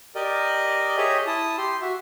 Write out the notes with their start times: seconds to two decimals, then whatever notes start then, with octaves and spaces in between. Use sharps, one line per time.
0.15 G4 A#4 D5 D#5
0.97 G4 G#4 C#5 D#5 E5
1.27 E4 A5 D#6
1.58 G4 C6
1.82 F#4 E5